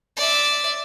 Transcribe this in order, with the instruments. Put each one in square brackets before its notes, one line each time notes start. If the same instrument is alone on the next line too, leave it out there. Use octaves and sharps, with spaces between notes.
[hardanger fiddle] D5 E5